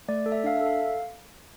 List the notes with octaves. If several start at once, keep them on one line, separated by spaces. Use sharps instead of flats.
A3 D5
A4
E5
D4 F5
E5
A4
F5